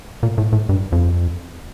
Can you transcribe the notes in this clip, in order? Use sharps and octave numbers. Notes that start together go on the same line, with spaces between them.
A#2
A2
A2
G2
F2